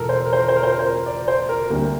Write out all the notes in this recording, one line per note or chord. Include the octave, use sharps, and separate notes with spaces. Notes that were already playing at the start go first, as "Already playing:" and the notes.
Already playing: E1 E2 A4 A#4
C5
A#4
C5
A#4
C5
A#4
C5
A#4
C5
A#4
D5
C5
A#4
D2 C3 G3 A#3 A#4